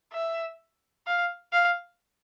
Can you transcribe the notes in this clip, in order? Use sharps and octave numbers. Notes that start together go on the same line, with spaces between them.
E5
F5
F5